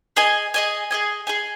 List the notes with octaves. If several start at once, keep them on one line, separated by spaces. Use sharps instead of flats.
G#4 D#5 G#5
G#4 D#5 G#5
G#4 D#5 G#5
G#4 D#5 G#5